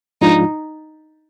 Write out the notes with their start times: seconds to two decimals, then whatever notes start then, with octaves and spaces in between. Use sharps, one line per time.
0.21 G#2 F3 G#3 D4 D#4 F4